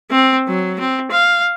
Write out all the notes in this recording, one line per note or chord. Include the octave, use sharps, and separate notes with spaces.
C4
F#3
C4
F5